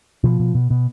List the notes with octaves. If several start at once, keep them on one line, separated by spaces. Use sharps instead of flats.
B2 F3
B2
B2
B2